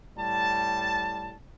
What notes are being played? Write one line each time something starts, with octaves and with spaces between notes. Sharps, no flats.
A2 G3 A5